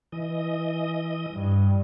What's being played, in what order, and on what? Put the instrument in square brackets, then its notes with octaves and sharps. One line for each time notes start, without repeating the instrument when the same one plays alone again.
[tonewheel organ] E3 D#5
[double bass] G2